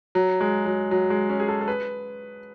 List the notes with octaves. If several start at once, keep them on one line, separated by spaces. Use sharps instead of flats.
F#3
G#3
F#3
F#3
G#3
C#4
G#4
A4
A4
B4